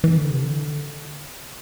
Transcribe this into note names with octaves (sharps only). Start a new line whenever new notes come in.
E3
D3
C3
D3